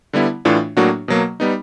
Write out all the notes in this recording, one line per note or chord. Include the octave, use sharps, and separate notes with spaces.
D3 G3 B3 E4
A2 E3 A3 D4 F4
A2 F#3 A#3 D4 F#4
B2 F#3 A#3
G3 B3 D#4